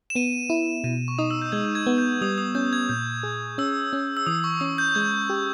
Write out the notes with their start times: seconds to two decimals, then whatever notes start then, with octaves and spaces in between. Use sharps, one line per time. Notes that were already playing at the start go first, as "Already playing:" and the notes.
0.10 E7
0.15 B3 D#7
0.50 E4
0.84 B2 D#7
1.08 C#6
1.18 D#4 D#6
1.31 E6
1.42 G6
1.52 G#3 G#6
1.65 G6
1.75 G#6
1.87 B3
1.98 G6
2.21 G3 D#6
2.38 D#6
2.55 C#4 G6
2.73 G#6
2.89 A#2 G6
3.23 G#4
3.58 C#4 E6
3.93 C#4
4.17 E6
4.26 E3 D#6
4.44 C#6
4.60 C#4 D#6
4.78 G6
4.95 G#3 G#6
5.30 G4